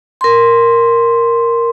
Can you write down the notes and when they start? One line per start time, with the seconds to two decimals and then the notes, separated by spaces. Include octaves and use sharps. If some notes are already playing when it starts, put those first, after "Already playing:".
0.21 A#4 C6